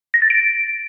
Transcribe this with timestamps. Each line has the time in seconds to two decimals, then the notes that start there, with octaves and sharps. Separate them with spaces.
0.14 A#6
0.22 A6
0.30 D7